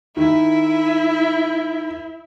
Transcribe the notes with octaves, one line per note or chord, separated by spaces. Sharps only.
D#3 E4